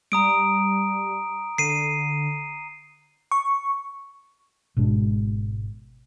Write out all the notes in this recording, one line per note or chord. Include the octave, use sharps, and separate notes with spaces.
G3 A#5 D#6 D7
D3 C7 D#7
C#6
G#1 B2 G#3 D4